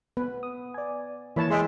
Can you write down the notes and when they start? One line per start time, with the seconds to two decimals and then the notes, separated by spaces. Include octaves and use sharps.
0.17 B3 B4
0.43 D#6
0.74 D5 G#5
1.36 E3 A#3 E4 C#5 A5 B5
1.50 G#3 G#4 E5 G5 C6